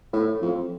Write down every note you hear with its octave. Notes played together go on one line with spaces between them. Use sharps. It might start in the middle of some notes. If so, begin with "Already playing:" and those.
A2
F2